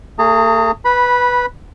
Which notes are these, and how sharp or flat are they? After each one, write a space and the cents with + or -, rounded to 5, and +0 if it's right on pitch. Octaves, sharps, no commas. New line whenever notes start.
A3 +40 G#4 +0 A#5 -40
B4 +0 B5 -15